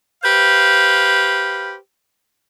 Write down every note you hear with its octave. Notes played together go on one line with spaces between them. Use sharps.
G4 B4 C5 F5